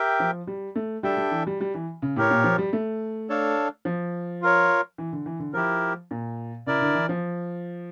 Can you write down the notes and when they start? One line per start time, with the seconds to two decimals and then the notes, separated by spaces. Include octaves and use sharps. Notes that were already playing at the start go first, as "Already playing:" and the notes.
Already playing: G4 A#4 E5 G5
0.20 F3
0.47 G3
0.76 A3
1.03 G3 D4 A4 E5 G5
1.17 G3
1.31 E3
1.47 G3
1.61 G3
1.74 E3
2.02 C#3
2.16 A2 G4 A#4 C#5
2.31 A#2
2.44 F3
2.58 G3
2.73 A3
3.29 D4 A4 C#5 F5
3.85 F3
4.42 F4 A#4 C#5
4.98 E3
5.12 D3
5.26 E3
5.39 D3
5.54 F3 E4 G4 A#4
6.11 A#2
6.66 C#3 E4 A#4 D5
6.81 D3
6.94 E3
7.09 F3